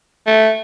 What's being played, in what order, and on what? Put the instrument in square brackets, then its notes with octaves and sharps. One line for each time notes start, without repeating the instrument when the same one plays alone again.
[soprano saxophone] A3